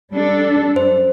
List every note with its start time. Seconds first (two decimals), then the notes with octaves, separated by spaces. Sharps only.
0.11 G3 D4 A4
0.76 F#2 C5